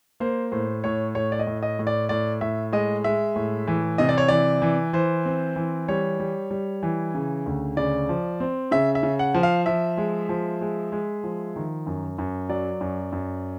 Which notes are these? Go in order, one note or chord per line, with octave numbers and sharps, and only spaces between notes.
A#3 C5
A2 C5
A2 C#5
A2 C#5
D5
D#5
A2
D#5
A2
D5
A2 D5
A2 E5
G#3 D#5
G#3 E5
A2
E3
C3 D#5
D5
C#5
E3 D5
E3
E3 C5
C4
E3
G3 C#5
G3
G3
E3
C#3
D2
C#3 D5
F3
C4
C#3 E5
E5
C#3
F#5
F3
F5
F3 E5
G#3
F3
G#3
G#3
F3
D#3
F#2
F#2
F#3 D5
F#2
F#2